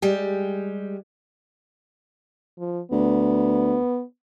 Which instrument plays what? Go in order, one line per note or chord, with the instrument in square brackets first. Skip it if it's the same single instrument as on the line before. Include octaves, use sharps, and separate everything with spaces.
[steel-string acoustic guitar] G3 G#3 G4
[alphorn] F3
[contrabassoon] D2 [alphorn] B3